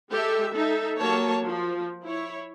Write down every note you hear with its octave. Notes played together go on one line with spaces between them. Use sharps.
G#3 G4 A4 E5
D#4 A4 E5
F#3 A#3 G4 C#5 A5
F3
E4 C#5